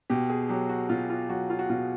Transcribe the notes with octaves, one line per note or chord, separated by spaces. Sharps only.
B2 G4
G#4
F#3 G4
F#4
B2 F4
F4
F#3 F#4
F4
F#4
B2 F4